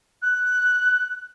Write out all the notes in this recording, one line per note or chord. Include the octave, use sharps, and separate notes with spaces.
F#6